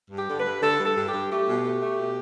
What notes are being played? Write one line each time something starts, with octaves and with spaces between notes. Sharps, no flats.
G2
G4
D3
B4
G2
D3 A4
G2
A4
G2
G4
G2
A3 G4
B2
A3
A3
B2